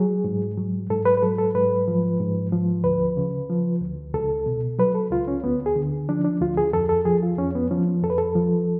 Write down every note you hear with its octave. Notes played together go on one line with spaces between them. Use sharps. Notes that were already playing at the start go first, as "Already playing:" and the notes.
Already playing: F#3 G#4
G#2
F#3
G#2 A4
B4
B4
F#3 A4
A4
G#2 B4
F3
G#2
F3
D2 B4
C#3
F3
D2
C#2 A4
B2
F#3 B4
A4
C#2 F4
C#4
D2 B3
G#4
D3
F3 D4
D4
D2 F4
G#4
F2 A4
A4
F3 G#4
F4
F2 C#4
B3
F3 C#4
F2 A4
B4
A4
F3